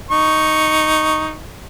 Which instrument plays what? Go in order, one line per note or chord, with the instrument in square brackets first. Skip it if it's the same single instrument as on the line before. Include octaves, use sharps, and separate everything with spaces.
[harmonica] D#4 C#6